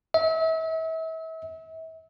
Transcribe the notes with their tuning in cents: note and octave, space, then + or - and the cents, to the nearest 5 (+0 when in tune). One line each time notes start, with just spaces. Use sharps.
E5 -35